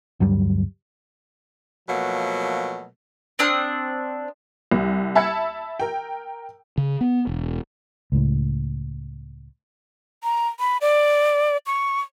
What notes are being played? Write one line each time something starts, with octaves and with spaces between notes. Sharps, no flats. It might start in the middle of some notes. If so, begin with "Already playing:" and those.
D2 G2 F#3 G3
B2 F3 F#3 A3 A#3
C4 D4 D#6 F6
C2
E5 A5 B5 E6 G#6 C#7
A#4 G5
C#3
B3
E1
C#2 A2
A#5
B5
D5
C#6